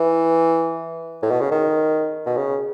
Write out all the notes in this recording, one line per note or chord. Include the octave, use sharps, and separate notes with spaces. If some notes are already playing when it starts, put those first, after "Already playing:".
Already playing: E3
A2
B2
C#3
D#3
B2
C#3